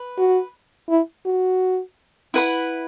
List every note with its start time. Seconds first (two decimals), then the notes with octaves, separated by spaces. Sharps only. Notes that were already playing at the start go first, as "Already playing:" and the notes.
Already playing: B4
0.18 F#4
0.89 E4
1.26 F#4
2.34 E4 B4 F#5 B5